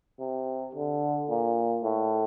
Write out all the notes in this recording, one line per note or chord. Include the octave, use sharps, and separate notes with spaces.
C3
D3
A#2
A2